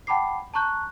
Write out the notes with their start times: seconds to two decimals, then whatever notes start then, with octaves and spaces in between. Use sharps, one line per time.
0.07 F#5 G5 A5 B5 D6 C7
0.54 A5 A#5 C#6 F#6 G6